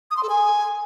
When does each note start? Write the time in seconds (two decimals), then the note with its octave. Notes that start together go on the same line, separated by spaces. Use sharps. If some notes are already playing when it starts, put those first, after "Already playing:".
0.11 D#6
0.17 C6
0.23 A4
0.29 G#5